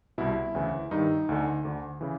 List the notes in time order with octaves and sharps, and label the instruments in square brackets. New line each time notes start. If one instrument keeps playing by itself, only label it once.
[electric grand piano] C2 B2 E4
D2 C#3 E3
G2 D#3 D#4
D2 D3
D2 D3
C#3 E3